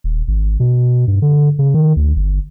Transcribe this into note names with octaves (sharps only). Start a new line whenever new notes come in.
D#1
G#1
B2
G2
D3
C#3
D#3
D2
G1